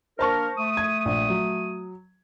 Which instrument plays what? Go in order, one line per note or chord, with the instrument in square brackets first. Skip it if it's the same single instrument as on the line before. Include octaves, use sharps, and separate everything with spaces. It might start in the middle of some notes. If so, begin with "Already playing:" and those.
[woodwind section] A#3 D4 A#4 [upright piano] C5 A5 C#6
[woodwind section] A3 D#6
[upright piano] G#6
A#1
F#3